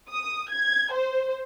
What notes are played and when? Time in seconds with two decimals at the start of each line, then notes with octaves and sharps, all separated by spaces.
0.10 D#6
0.50 G#6
0.92 C5